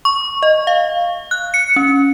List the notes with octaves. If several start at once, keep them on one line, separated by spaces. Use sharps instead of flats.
C#6
D#5
F5
F#6
C#7
C#4